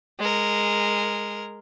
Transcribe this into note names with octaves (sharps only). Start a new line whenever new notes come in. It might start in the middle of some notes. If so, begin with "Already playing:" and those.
G#3 A#4